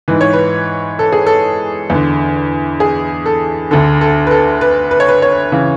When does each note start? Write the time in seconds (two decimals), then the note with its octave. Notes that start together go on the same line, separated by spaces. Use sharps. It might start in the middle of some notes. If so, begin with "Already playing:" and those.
0.08 G#2 E3 B4
0.21 C#5
0.33 B4
0.99 A4
1.13 G#4
1.27 A4
1.90 E2 D3
2.80 G#4
3.26 A4
3.71 D2 D3 A4
4.01 A4
4.27 B4
4.31 A4
4.61 B4
4.91 B4
5.00 C#5
5.09 B4
5.22 C#5
5.52 C#3 E3